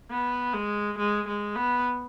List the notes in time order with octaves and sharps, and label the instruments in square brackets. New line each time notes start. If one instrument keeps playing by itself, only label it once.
[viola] B3
G#3
G#3
G#3
B3